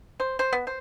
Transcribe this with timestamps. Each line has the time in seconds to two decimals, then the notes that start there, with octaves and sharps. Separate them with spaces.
0.20 C5
0.39 C5
0.53 B3
0.67 C5